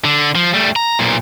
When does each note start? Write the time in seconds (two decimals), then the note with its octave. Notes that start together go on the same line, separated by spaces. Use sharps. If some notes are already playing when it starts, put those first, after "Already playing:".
0.04 D3
0.35 F3
0.54 G3 A3
0.76 A#5
0.99 B1 A#2